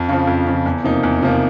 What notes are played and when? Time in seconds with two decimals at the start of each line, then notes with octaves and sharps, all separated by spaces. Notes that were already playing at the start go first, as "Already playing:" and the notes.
Already playing: F2
0.09 C#3 F3
0.27 F2
0.47 C#3 F3
0.66 E2
0.84 C3 F3 A#3 D#4
1.03 E2
1.22 C3 F3 A#3 D#4